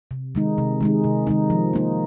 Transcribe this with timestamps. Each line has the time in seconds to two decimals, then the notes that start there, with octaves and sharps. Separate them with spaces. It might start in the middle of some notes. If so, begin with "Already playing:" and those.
0.11 C3
0.35 D#3 G#3 D#4
0.58 C3
0.81 D#3 G#3 D#4
1.04 C3
1.27 D#3 G#3 D#4
1.50 F3
1.73 A#3 D#4